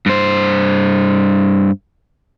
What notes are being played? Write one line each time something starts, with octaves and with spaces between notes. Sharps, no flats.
G2 C5